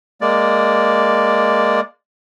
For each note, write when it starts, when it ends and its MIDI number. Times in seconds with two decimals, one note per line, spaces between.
0.21 1.80 56
0.21 1.80 58
0.21 1.80 74